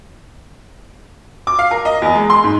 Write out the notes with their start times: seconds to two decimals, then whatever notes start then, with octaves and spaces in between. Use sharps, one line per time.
1.47 D6
1.59 F5
1.71 A#4
1.85 D#5
2.02 E2
2.15 G#3
2.30 C6
2.44 G#2